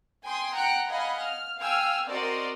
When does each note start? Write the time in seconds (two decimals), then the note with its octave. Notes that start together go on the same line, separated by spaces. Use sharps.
0.24 G5 G#5 C6 D#6
0.54 F#5 G5 A#5 F#6 C#7 D7
0.87 D#5 F5 F#5 G#5 B5
1.21 F6
1.59 F5 G5 G#5 E6 F6
2.08 C4 F#4 A#4 D5 D#5 C6